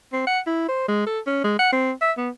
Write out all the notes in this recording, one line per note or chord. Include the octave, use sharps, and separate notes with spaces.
C4
F#5
E4
C5
G#3
A4
C#4
G#3
F#5
C4
E5
B3